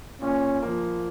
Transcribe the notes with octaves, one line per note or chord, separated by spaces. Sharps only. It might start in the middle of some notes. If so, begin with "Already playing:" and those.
A#2 C#4
F3 A#3